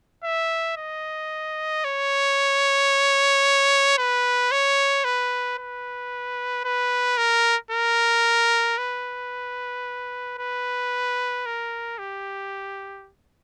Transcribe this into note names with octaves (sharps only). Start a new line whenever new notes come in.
E5
D#5
C#5
B4
C#5
B4
B4
B4
A#4
A#4
B4
B4
A#4
G4